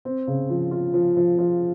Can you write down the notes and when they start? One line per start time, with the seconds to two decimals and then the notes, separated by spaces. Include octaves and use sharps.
0.05 C4
0.27 C#3
0.50 F3
0.71 F4
0.94 F3
1.17 F3
1.39 F3